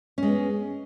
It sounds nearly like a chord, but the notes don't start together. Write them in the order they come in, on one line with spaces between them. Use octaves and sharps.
C#4 G#3 B3